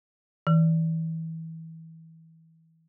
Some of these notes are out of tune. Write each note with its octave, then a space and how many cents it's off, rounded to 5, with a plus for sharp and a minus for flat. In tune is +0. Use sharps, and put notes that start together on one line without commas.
E3 -25